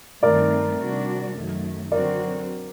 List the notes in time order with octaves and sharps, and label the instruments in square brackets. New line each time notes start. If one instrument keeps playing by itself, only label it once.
[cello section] G2 D#3 A3 C4 [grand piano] A#4 D5
[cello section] C3 G3 D4 F#4
F#2 D#3 F#3 A3
[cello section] D3 F#3 C4 F#4 [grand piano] A#4 D5